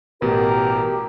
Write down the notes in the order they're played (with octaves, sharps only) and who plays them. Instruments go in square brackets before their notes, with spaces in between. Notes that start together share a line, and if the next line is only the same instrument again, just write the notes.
[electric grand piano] A1 B2 [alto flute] G4 [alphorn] A#4